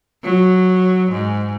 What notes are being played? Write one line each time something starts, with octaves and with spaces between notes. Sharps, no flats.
F#3
G#2